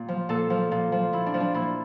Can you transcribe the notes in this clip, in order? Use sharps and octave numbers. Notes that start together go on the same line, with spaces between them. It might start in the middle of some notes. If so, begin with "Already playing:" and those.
Already playing: A#2 F4
F3
A#2 A4
F3
A#2
F3
A#2 E4
D4
F3
D4
A#2 E4